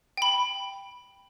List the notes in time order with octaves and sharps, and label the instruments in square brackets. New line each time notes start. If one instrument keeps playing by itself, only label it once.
[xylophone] G5 B5